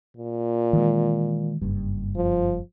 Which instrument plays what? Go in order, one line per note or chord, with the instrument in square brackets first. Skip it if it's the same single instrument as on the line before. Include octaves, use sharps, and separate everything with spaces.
[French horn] A#2
[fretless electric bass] D#3 E3 G#3
F#1 G2
[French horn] F3